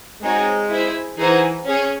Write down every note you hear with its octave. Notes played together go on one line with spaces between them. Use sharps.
G#3 C4 D#4 F#4 C#5
E4 G#4 C5 E5
E3 D#4 G#4 C5 F#5
C#4 G#4 C#5